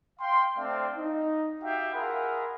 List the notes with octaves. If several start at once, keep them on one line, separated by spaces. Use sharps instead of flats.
F5 G5 C6
A3 C4 D4 C5 D5 F5
D#4
F#4 G4 E5 F5 G5
F4 G#4 A#4 E5 F#5 B5